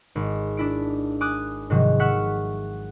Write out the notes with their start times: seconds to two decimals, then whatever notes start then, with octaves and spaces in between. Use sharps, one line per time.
0.15 G#1
0.57 D4 E4 D7
1.21 G#5 D6 D#6 F#6
1.70 G#2 C3 D#3 F3 F#3
2.00 E5 F#5 C#6 F6 F#6